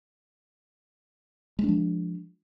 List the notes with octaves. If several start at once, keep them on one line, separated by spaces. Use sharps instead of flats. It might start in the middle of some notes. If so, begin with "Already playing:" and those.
F3 G#3 D4